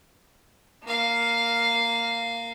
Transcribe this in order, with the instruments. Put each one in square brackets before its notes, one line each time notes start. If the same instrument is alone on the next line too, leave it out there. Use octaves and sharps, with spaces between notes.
[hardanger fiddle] A#3 F5